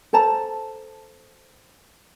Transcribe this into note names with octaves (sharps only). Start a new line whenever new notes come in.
A4 C5 A5 A#5